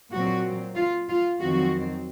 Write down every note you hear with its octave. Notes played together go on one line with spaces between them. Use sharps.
A#2 F#3 C4 F#4
F4
F4
F2 D#3 F#3 C4 F#4